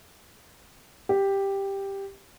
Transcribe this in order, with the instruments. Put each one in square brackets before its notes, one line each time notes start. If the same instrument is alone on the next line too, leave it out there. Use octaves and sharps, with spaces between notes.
[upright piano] G4